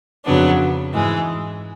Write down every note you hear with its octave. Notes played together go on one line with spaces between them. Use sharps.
F2 C#3 F#3 B3 D4
G#2 E3 G#3